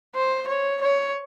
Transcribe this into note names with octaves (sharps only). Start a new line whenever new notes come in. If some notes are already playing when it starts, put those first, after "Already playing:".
C5
C#5
C#5